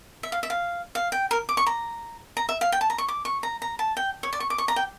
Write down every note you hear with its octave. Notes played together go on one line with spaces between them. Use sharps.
E5
F5
E5
F5
F5
G5
A#4
D6
C#6
A#5
A#5
E5
F5
G5
A5
A#5
C#6
D6
C#6
A#5
A#5
A5
G5
C#5
D5
C#6
D6
C#6
A#5
G5